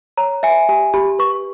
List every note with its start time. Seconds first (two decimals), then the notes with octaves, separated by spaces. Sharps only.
0.18 C#5 A#5
0.43 E5 G#5
0.69 G4 G#5
0.94 G4 B5
1.19 B4 C#6